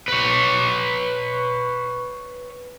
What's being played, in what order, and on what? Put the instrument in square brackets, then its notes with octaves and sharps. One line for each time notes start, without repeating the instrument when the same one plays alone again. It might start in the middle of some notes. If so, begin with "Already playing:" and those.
[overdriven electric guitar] B4 C#5